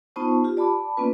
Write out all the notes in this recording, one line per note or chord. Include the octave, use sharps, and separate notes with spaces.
B3 D#4 F4 C5 A5 C#6
F4 G4
D5 A5 B5 D6
A#3 B3 C#4 F4 B4